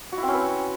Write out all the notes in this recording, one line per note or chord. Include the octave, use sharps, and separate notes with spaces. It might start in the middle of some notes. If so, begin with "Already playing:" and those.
F#4
E4
C4
C#4
B4